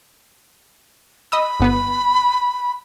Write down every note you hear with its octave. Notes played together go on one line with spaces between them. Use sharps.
D#5 B5 D#6 E6
G1 B3 B4